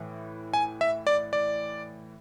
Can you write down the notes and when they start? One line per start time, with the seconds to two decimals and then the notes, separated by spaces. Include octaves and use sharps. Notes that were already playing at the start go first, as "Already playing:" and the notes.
Already playing: A2 E3
0.54 G#5
0.81 E5
1.07 D5
1.33 D5